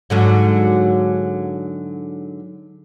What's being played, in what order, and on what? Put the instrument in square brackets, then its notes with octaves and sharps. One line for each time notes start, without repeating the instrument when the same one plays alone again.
[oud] G#2 D3 F#3